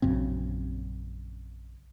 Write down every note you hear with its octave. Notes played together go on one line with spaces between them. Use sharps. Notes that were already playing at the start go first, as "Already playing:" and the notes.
A#1 F#2 C#3 C4